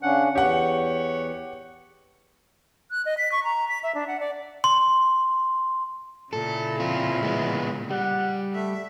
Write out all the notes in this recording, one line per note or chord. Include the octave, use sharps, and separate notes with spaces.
C#3 C#4 D4 F#5
E2 G4 C#5 F#5
F#6
D#5
B6
C#6
A#5
B6
E5
D4
F#5
D5
C6
A#2 C#3 E4 A4
C4 F4
G#3 B3
G3 F#5
A3 E5